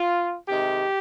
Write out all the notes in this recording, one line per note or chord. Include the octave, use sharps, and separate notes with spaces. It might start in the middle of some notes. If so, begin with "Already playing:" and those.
Already playing: F4
C3 D#3 G#3 G4